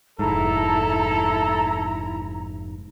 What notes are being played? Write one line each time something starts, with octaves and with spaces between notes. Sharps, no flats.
F1 G#2 E4 A4 A#5